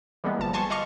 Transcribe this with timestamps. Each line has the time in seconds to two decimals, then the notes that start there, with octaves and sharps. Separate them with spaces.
0.24 E3 G3 G#3 A#3 B3
0.39 G1 F3 A5
0.53 G#5 A5 C6 C#6
0.70 D#5 F5 C6 C#6